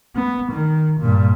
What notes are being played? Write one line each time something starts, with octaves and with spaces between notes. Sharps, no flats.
B3
D#3
G2 A#2